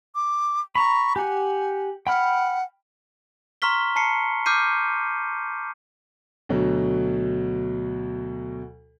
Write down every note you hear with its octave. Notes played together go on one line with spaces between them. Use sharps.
D6
A#5 B5 C#6
G4 F#5 G#5
F#5 G5 B5 F6
A#5 C6 C#6 F6 B6 G7
A5 A#5 C7 C#7
D6 F6 G6 C7 D#7
D2 B2 F#3